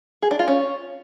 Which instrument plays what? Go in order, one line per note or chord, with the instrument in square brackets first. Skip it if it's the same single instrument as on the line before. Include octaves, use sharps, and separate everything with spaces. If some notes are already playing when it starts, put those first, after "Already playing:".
[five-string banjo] G#4
D4
F4
C#4